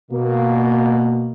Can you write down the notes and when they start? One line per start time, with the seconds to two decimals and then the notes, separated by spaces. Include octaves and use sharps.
0.11 B2 A#3